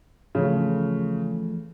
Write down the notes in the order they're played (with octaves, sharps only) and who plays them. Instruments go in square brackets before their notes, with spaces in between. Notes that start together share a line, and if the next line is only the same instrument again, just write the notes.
[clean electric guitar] E2 F3 A3 [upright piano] C#3